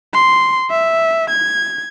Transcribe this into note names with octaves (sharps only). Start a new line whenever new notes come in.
C6
E5
G#6